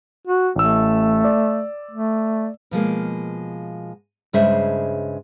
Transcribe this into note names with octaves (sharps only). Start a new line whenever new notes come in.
F#4
A1 A3 E6
D5
A3
B2 F3 G#3 A#3
G2 C#3 G#3 G#4 C5 E5